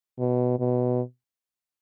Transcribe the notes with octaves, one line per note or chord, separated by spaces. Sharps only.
B2
B2